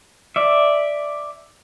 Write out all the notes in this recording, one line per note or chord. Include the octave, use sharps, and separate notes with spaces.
D5 E5